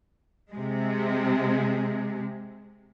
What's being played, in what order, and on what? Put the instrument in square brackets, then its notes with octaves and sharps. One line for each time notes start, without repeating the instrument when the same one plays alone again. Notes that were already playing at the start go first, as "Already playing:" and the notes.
[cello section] C3 G#3